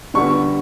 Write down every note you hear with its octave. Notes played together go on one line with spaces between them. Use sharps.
D3 G3 B3 C#6